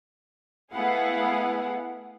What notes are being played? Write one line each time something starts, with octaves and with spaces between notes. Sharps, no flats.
A3 B3 E4 G#4 F5 F#5